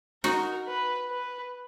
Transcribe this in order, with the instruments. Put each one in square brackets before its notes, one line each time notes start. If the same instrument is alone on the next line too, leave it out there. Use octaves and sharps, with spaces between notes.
[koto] D#4 F#4 [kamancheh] A#4
[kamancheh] B4
B4